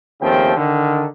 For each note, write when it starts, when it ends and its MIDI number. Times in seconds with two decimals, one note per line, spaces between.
0.21 0.53 39
0.21 0.53 49
0.21 0.53 53
0.21 0.53 57
0.21 0.53 60
0.21 0.53 79
0.55 1.04 50
0.55 1.04 51